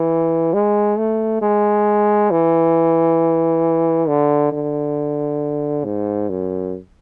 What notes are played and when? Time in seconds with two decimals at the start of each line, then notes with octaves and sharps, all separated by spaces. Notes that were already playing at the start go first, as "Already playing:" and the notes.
Already playing: E3
0.53 G#3
0.98 A3
1.42 G#3
2.31 E3
4.08 D3
4.52 D3
5.84 G#2
6.29 F#2